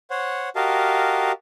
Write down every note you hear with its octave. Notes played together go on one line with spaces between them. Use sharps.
C5 C#5 F#5
F#4 G4 A#4 D#5 F5 A5